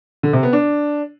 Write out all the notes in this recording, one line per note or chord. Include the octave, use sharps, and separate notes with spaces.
D3
C3
B3
D4